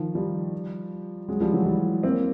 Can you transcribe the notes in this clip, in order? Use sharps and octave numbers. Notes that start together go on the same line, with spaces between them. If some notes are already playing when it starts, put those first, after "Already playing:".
Already playing: D#3 F3
F3 G3
F#3 G#3
F3 G3
E3 F#3
F3 G3
A#3 C4